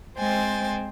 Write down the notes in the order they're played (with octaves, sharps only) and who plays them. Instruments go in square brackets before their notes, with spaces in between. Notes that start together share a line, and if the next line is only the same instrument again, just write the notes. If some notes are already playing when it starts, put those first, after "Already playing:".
[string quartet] G#3 C4 C5 G5 G#5 A6